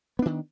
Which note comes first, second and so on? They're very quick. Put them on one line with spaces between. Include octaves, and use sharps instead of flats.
B3 D4 D#3